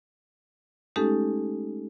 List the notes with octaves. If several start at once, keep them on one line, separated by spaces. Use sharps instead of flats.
G#3 A3 C#4 D#4 G4 A4